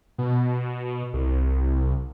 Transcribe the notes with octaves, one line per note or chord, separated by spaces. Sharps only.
B2
C2